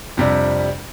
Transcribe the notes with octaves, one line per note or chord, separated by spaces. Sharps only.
F2 C3 G3 D4